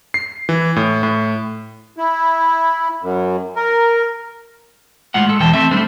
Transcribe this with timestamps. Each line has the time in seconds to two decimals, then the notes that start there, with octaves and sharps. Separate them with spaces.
0.14 C7
0.49 E3
0.76 A2
1.03 A2
1.96 E4
3.02 F#2
3.56 A#4
5.14 A2 G#3 F4 F#5
5.27 G#3 A4
5.40 E2 B2 E3 G5 A5
5.53 A3 C4 A4 E5
5.71 G3 A3 D4 C5